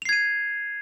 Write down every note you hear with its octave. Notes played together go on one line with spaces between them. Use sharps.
G#6 C7 D#7 F7